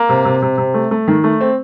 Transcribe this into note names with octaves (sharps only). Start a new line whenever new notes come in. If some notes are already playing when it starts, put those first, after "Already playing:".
Already playing: A#3
C3
C3
C3
C3
A3
A3
D#3
A3
C4